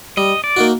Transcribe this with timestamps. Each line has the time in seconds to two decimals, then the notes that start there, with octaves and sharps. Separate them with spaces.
0.17 G3 D#5
0.44 D5
0.57 A#3 D#4 F#4